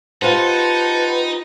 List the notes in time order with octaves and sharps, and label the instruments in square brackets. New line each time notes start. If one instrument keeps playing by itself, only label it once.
[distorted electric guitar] D#4 [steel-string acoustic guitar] F4 G4 C5 [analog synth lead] B4 [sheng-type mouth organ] F#5 A5